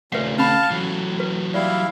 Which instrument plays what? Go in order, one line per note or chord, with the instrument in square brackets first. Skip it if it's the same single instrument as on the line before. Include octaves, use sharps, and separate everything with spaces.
[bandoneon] D#2 A#2 [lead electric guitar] C#3 A3 [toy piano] B4 E5 F#5
[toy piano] C#4 B5 [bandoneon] F5 A5 F6
[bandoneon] A2 [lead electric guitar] E3 F#3
[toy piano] B4
[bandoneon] G3 E4 F5 [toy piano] D5